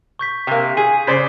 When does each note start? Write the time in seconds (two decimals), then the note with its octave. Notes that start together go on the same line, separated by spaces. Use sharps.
0.19 C#6 G6 B6
0.47 C3 A#3
0.77 G#4 D#7
1.07 C#3 C5 D5 B6 C7